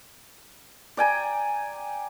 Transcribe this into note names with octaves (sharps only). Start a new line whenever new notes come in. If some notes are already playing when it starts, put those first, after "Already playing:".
D5 G5 G#5 A#5